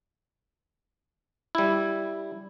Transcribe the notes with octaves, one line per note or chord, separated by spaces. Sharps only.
G3 E4